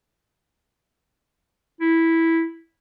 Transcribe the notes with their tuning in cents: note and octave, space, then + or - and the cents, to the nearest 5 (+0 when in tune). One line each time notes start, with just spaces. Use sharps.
E4 -5